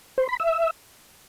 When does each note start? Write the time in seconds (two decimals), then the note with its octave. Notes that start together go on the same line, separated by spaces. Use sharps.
0.18 C5
0.29 B5
0.40 E5